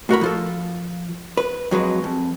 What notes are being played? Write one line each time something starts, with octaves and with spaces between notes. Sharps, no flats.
A2 F#4 A#4 B5
F3 F4 A4
B4
F2 F#3 G#3 B4
F2